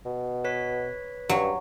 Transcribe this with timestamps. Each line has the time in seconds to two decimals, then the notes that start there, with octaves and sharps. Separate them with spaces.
0.06 B2
0.44 B4 C#5 B6
1.29 G2 F#3